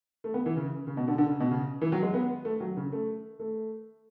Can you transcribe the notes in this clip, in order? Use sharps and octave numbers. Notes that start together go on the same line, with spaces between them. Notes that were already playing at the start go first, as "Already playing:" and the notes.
A3
B3
E3
C#3
C#3
B2
D3
D3
C#3
B2
C#3
E3
F#3
G#3
B3
A3
F#3
C#3
A3
A3